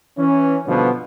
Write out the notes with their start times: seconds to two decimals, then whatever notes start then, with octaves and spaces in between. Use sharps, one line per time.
0.17 E3 C#4
0.66 G2 B2 D3 F3 B3